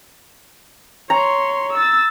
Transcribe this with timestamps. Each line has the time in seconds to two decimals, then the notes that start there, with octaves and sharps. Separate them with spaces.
1.10 C#5 A#5 C6
1.73 E6 A6